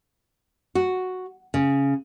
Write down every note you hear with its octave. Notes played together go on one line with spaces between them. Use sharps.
F#4
C#3